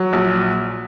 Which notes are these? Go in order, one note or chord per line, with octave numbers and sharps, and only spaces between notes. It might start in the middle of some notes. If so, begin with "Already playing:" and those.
Already playing: F#3
A#1